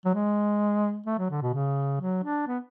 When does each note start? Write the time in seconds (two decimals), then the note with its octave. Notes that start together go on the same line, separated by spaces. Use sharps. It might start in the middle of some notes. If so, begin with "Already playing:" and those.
0.05 F#3
0.14 G#3
1.06 A3
1.18 F#3
1.30 D3
1.42 B2
1.54 C#3
2.01 F#3
2.24 D4
2.47 B3